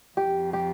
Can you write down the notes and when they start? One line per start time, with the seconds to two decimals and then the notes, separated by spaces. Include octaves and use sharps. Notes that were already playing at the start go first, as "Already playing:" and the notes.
0.17 F2 G4
0.53 G4